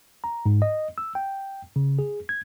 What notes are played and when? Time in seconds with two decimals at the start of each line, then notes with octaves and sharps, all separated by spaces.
0.24 A#5
0.46 G#2
0.62 D#5
0.98 E6
1.15 G5
1.76 C#3
1.99 G#4
2.29 G#6